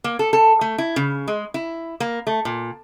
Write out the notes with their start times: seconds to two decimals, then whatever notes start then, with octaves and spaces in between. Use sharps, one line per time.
0.04 A#3
0.19 A4
0.33 A4
0.61 A3
0.78 E4
0.96 C#3
1.28 G#3
1.54 E4
2.00 A#3
2.27 A3
2.45 A#2